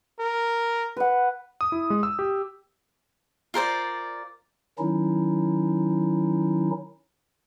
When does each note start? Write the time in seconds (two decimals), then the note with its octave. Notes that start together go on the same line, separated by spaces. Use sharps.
0.20 A#4
0.97 B4 F#5
1.61 D#6
1.72 E4
1.90 G#3
2.03 E6
2.19 G4
3.54 F4 A#4 C5 D5
4.79 D#3 F#3 C#4 D#4 E4